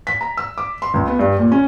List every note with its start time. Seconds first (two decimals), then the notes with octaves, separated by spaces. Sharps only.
0.07 B6
0.21 A#5
0.37 E6
0.58 D6
0.82 C6
0.94 C#2
1.07 B3
1.19 G2
1.38 A#2
1.52 C#4